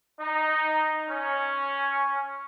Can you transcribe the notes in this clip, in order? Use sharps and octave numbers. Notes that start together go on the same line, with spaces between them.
D#4
C#4